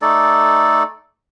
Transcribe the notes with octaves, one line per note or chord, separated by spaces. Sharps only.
A3 D#4 A4 D5